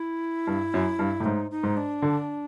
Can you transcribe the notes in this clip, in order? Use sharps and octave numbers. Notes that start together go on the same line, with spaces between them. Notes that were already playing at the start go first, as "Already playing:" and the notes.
Already playing: E4
G2
F#2
G2
A2
G#2 D#4
D#4
G#2
D4
D3